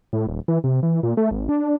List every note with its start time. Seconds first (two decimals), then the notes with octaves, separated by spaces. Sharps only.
0.13 A2
0.27 D#1
0.48 E3
0.64 C3
0.83 E3
1.03 A#2
1.17 A3
1.31 G#1
1.49 D4